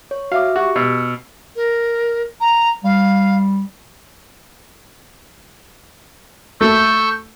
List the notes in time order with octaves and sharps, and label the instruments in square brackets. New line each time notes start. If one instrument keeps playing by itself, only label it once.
[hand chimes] C#5
[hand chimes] F#4 E5 D6 [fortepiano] F5
[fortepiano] F#4 [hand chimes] G4
[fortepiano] B2 [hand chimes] E6 F6 C#7
[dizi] A#4
A#5
[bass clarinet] G3 [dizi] F5
[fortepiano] A3 [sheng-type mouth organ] C#6 E6 G6